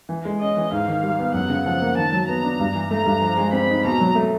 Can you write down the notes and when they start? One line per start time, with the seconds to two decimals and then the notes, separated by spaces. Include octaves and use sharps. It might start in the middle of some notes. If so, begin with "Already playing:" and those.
0.09 E3
0.25 G#3
0.40 C#4 D#5
0.57 E3
0.72 G#2 F5
0.88 D#3
1.03 G3
1.19 B3
1.34 F#2 F#5
1.50 C#3
1.66 F3 F#5
1.82 A#3
1.97 D#3 A5
2.12 F#3
2.28 B3 A#5
2.43 D4
2.60 G2
2.75 E3
2.91 A3 A#5
3.06 G2
3.22 F3
3.37 G#3
3.53 C4 B5
3.69 D#4
3.85 B2 A#5
4.00 F#3
4.15 A3